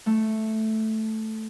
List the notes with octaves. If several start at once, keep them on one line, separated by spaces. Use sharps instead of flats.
A3